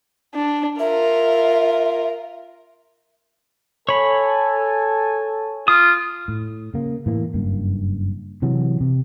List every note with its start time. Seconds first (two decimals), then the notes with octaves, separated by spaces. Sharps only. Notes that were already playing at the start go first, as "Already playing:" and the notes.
0.35 D4
0.79 F4 A#4 E5
3.89 A4 C#5 G#5 A5 B5
5.68 F4 D#6
6.28 A2
6.74 C#3 A#3
7.06 A2 E3 A#3
7.34 F#1 G2 A#3
8.42 C3 E3 F#3
8.81 C3